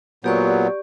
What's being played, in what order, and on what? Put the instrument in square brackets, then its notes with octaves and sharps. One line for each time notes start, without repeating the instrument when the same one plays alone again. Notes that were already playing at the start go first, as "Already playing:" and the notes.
[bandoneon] A#2 F#3 B3 [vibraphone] G4 D5 C#6